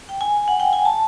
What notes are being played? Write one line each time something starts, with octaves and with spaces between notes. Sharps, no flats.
G5
G#5
F#5
G5
G#5
A5